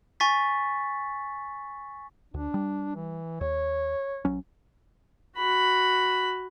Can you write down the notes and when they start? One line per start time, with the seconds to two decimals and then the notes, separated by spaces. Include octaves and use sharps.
0.20 G#5 C#6 A6 B6
2.34 D2 D4
2.54 G3
2.96 E3
3.41 D#2 C#5
4.25 A#1 F#3 C#4
5.37 F#4 B5